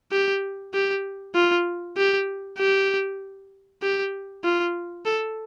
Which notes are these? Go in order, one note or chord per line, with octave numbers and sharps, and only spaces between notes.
G4
G4
F4
G4
G4
G4
F4
A4